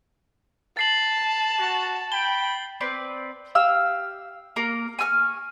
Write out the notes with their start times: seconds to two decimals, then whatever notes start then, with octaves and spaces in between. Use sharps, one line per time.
0.77 A5 A6 C7 F#7
1.59 F#4
2.12 G5 B5 G7
2.81 C4 B4 D5
3.55 G4 F5 E6
4.56 A#3 A#4
4.99 G#5 C#6 E6 F6